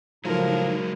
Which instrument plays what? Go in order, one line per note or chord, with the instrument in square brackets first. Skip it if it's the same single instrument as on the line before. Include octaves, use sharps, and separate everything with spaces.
[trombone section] A2 F3 [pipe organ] C#3 D#4 [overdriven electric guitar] F#3 G#3 [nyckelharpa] A#4